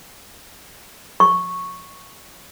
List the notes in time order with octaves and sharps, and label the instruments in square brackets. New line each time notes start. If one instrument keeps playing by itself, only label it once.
[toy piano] C#6